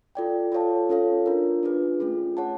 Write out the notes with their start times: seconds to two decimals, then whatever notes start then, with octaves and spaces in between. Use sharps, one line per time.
0.15 F4 A4 D5 G5
0.52 F4 A4 C#5 F5 A5
0.89 C#4 F4 A4 C#5 F5
1.26 D4 F4 A#4
1.63 D4 F4 G#4 B4
2.00 A3 C#4 F4 G#4
2.37 G#4 C#5 F#5 A5